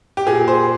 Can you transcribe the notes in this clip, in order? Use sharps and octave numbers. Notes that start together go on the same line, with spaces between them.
G4
A#2 G#4
C5